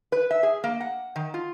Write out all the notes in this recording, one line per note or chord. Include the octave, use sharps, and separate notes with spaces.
B4
E5
G#4
A#3
F#5
D#3
F4